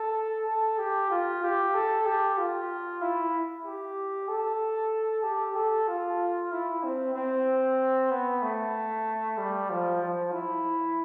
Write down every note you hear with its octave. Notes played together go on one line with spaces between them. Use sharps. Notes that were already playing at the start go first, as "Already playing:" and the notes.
Already playing: A4
A4
G4
F4
G4
A4
G4
F4
E4
G4
A4
G4
A4
F4
E4
C4
C4
B3
A3
G3
F3
F3
E4